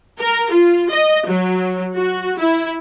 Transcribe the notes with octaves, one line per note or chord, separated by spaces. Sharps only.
A#4
F4
D#5
F#3
F#4
E4